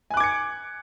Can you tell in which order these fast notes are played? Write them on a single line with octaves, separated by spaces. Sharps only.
G#5 F#6 D6 G#6 C#7